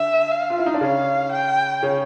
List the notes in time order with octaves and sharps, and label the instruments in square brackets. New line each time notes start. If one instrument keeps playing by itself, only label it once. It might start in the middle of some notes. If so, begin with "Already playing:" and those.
Already playing: [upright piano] D3 D4 [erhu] E5
[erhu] F5
[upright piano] F4
E4
D#4
D4
[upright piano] C#3 C#4 [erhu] F5
[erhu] G5
[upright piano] C#3 C#4